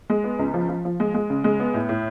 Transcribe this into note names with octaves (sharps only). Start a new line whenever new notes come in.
G#3
B3
C#2
F3
F3
F3
G#3
G#3
C#3
G#3
B3
A2
A2